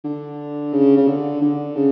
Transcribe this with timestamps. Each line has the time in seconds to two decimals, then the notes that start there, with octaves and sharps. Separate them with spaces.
0.04 D3
0.73 C#3
0.97 C#3
1.07 D3
1.42 D3
1.76 C#3